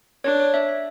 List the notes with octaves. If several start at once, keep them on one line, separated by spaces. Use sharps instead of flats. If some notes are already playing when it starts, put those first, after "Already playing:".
D4 C#5
C#5
E5
E5